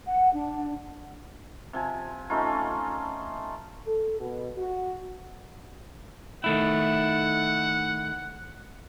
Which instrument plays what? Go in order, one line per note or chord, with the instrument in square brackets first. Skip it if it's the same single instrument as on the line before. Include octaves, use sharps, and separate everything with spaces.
[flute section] F#5
D4
[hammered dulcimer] C3 F3 G#5
A3 C#4 D#4 F4
[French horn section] A4
B2
F#4
[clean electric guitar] D#3 A3 E4 [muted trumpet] F#5